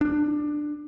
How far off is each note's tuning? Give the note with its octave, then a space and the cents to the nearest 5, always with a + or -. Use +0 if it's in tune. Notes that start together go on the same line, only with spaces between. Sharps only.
D4 +15